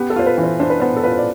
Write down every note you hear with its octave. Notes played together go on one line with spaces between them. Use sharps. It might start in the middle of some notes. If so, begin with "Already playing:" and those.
Already playing: B3 G4
A4
F4 C5
B4
E3
C5
D4 C5
B4
B3 C5
A4
F4 B4
C5
D5